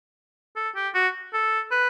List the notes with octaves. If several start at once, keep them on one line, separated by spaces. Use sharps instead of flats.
A4
G4
F#4
A4
B4